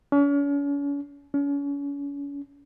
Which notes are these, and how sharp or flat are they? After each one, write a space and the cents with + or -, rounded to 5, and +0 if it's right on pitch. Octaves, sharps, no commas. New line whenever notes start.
C#4 +40
C#4 +35